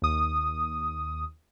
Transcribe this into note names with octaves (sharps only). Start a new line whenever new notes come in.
D#2 D#6